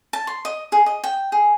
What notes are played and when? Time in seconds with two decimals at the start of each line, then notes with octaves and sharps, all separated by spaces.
0.13 A5
0.27 C6
0.45 D#5
0.72 G#4
0.86 D#5
1.04 G5
1.32 G#4